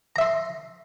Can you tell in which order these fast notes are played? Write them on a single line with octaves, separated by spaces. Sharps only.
A#5 E5 C6